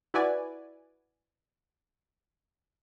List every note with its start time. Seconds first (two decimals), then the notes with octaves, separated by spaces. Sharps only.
0.14 E4 F#4 B4 D5 G#5